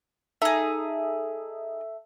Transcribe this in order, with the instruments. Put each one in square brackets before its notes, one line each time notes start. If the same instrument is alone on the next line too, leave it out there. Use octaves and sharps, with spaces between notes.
[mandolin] D#4 G#4 [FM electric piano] A4 E5